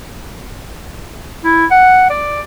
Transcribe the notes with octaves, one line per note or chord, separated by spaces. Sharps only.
E4
F#5
D5